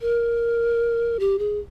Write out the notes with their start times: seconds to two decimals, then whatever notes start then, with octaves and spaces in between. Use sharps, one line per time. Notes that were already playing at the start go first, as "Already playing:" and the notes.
0.01 A#4
1.20 G4
1.39 G#4